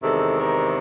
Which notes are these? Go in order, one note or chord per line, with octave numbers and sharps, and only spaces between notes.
E2 C3 D#3 G#3 A4
A#4